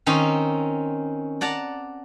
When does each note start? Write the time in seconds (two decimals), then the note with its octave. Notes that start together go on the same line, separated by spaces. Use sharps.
0.06 D#3 C4 C#4 D#4
1.41 D5 F#5 A5 A#5